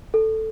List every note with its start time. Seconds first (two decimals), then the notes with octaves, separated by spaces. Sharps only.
0.14 A4